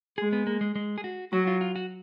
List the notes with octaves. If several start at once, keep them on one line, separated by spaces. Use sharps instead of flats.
G#3 G#4
B3
A#3
G#3
G#3
G#4
F#4
F#3 F#4
F4
F4
F#4